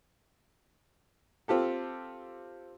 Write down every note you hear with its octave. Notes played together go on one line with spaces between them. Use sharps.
C4 F4 G4 A4